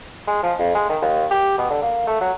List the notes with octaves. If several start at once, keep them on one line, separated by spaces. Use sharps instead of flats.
G#3
F3
F2
G#3
D#3
D#2
G4
B2
D3
A#3
A3
F#3